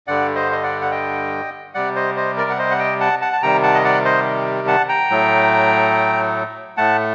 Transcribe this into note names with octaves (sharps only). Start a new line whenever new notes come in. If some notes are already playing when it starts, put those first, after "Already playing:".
G2 D3 G3 D5 F#5
C5 D#5
D#5
D5 F#5
F#5
D#5 G5
C3 G3 D5 F#5
C5 D#5
C5 D#5
A#4 D5
F#5
C5 D#5
F#5
D#5 G5
F#5 A5
F#5 A5
A5
C3 D#3 G3 G5 A#5
F#5 A5
D#5
D5 F#5
C5 D#5
F#5 A5
G5 A#5
A2 F#3 A3
A2 A3 F#5 A5